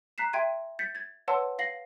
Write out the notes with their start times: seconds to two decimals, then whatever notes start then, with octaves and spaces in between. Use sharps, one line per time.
0.18 A#5 F#6 B6 C7 E7
0.33 E5 G5 C6 G#6 D#7
0.79 G6 A6 B6 C#7
0.95 G#6 A6
1.28 B4 C#5 F#5 A5 C6 E6
1.59 F5 A#6 C7 F#7